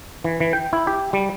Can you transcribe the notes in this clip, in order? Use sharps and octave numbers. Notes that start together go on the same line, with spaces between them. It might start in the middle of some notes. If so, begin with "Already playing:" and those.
E3
E3
G5
E4
G4
G3